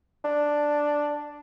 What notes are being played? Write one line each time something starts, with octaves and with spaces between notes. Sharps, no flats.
D4